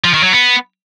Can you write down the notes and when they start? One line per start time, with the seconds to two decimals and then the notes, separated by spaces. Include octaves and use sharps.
0.04 F3
0.14 D#3
0.23 F#3
0.33 B3